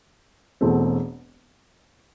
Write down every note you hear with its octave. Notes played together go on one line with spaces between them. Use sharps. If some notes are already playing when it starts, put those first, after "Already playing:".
E1 E2 B2 A3 C4